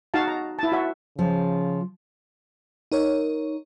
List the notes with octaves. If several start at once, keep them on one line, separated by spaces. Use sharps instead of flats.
D#4 F#4 F5 A5
A#5
E4 A5
F#4 E5
C#3 F3
D#4 A#4 C#5